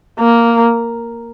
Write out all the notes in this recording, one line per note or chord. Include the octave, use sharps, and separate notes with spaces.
A#3